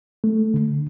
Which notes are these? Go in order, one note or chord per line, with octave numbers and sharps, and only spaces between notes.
A3
D3